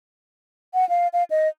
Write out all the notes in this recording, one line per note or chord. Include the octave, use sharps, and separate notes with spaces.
F#5
F5
F5
D#5